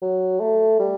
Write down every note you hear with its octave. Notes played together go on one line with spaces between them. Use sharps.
F#3
A3
G3